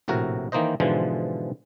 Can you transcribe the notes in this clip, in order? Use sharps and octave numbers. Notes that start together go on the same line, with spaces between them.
A#1 A2 C3 F#4 A#4
D#3 E3 A#3 D#4 C5 D#5
G#2 B2 D3 E3 F3 G#3